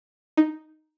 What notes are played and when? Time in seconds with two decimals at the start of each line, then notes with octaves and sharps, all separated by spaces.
0.37 D#4